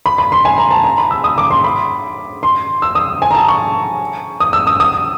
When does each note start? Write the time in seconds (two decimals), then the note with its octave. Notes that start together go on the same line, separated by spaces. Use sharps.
0.06 B5
0.18 B5
0.32 C6
0.45 G#5
0.58 A#5
0.71 A5
0.84 A#5
0.98 B5
1.11 E6
1.24 D#6
1.38 D6
1.51 C6
1.64 B5
2.43 C6
2.82 E6
2.95 D#6
3.22 G#5
3.31 A#5
3.35 A5
3.48 C#6
4.40 D#6
4.53 E6
4.67 D#6
4.80 D#6